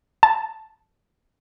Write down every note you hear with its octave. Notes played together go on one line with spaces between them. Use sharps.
A5